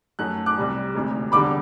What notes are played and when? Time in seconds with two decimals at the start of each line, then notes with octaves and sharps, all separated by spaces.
0.19 F#2 F#3 A3 F#6
0.46 D6 F#6
0.57 C2 C3 G3
0.94 E1 D2 C3
1.32 E1 E2 D3 G3 B5 D6